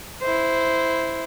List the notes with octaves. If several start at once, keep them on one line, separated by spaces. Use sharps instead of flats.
E4 C5